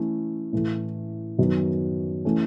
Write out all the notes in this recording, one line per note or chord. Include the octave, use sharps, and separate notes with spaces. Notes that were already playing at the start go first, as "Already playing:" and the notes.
Already playing: E3 A3 C#4 E4
A2 E3 A3
F#2 D#3 F#3 B3 F#4
E3 A3 C#4